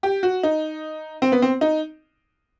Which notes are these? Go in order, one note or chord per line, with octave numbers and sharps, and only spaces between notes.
G4
F#4
D#4
C4
B3
C4
D#4